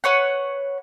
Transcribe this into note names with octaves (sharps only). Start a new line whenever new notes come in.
B4 C#5 F#5